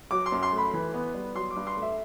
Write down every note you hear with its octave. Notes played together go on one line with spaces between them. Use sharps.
F#3 D6
C6
F#2
C6
A3
B5
E3
B3
G3
F#3 C6
D6
G2
C6
A3
E5